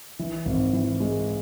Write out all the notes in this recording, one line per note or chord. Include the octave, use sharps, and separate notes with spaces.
E3
G#1
E3
G#3